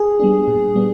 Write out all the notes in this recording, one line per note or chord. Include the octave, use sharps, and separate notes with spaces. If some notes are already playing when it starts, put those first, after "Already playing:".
Already playing: G#4
G3 B3 D4
A#2
G3 B3 D4